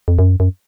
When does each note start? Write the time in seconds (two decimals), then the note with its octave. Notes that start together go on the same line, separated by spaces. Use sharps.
0.08 F2
0.19 F#2
0.40 F#2